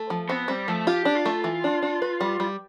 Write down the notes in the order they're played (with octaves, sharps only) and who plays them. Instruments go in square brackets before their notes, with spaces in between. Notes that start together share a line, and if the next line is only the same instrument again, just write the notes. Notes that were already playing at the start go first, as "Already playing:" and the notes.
Already playing: [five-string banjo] A3
F3
[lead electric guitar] B3 [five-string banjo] C4
[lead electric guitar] G3 [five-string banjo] C4
[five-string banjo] F3 [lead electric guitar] A3
[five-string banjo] F4 [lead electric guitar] G4
[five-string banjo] D4
[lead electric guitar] F4
[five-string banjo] A3
E3
D4
D4
B4
G3
G3